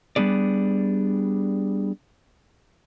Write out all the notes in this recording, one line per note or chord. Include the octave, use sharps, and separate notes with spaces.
G3 B3 D4 G#4 D5